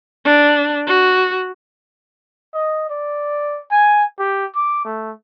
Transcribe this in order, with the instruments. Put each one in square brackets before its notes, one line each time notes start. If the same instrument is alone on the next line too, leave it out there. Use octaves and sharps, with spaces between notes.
[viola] D4
F#4
[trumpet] D#5
D5
G#5
G4
D6
A3